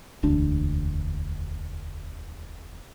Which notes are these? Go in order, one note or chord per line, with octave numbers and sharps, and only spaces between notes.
E1 D2 D4